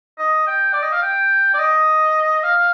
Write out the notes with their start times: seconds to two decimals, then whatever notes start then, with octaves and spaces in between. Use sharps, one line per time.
0.18 D#5
0.47 G5
0.73 D5
0.83 D#5
0.93 F5
1.02 G5
1.54 D5
1.59 D#5
2.44 F5